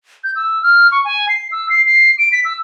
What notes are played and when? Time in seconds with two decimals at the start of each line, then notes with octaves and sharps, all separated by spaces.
0.24 G6
0.36 E6
0.63 F6
0.91 C#6
1.04 G#5
1.29 C7
1.52 E6
1.69 C7
1.86 C7
2.18 D7
2.32 B6
2.45 E6